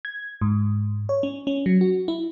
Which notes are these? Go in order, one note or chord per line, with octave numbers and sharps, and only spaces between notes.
G#6
G#2
C#5
C#4
C#4
F#3
F#4
E4